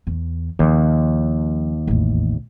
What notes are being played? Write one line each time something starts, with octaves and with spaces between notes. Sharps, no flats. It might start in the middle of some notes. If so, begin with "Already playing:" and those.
E2
D#2 F3
A1 E2